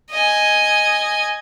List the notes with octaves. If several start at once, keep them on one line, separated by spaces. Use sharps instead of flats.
D#5 G#5